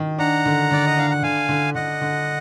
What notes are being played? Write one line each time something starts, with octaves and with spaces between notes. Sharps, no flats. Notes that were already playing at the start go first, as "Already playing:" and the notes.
Already playing: D#3
D4 F#5 A#5
D3
D3 D5
D#5
D4 F5
F#5
D3 F5 G#5
D3
D3 D#5 F#5
D3